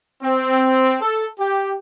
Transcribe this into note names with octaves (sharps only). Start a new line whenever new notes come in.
C4
A4
G4